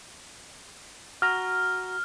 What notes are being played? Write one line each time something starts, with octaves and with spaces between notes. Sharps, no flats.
F#4 A#5 F6